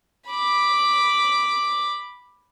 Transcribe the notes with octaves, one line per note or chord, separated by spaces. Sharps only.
B5 D6